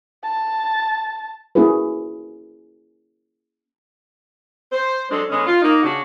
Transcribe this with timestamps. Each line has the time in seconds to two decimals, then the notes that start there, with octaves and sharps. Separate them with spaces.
0.24 A5
1.55 A#3 C#4 E4 F#4 G#4 B4
4.72 C5
5.10 F#3 G#3 C4 D4 A4
5.30 D3 G#3 B3 C#4
5.45 F4
5.62 A#3 D#4
5.83 C#3 C#4 D4 F#4